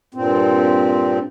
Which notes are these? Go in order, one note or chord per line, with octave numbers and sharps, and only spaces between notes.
G2 A#2 C4